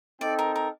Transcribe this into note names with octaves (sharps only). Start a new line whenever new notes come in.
C4 D#4 A4 D5 D#5 G5
A#4
A#4